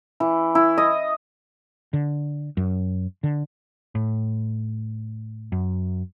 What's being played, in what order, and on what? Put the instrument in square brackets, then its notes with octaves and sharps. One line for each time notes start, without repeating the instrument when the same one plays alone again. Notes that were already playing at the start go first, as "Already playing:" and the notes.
[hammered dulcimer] E3
E4
D#5
[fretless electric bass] D3
F#2
D3
[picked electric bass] A2
F#2